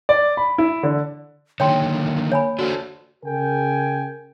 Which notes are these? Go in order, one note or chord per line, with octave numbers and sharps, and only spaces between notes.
D5
B5
E4
D3
D3 D#3 F#3 A#3 C#5 G5 C6
C#5 G#5 B5
D4 F#4 A4 C5
C#3 G#4 A#4 G5 G#5